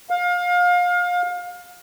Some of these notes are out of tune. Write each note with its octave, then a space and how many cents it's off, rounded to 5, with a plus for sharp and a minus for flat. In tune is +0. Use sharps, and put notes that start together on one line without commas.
F5 +30